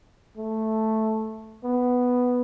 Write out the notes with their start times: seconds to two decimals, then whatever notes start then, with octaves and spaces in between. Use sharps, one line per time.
0.37 A3
1.64 B3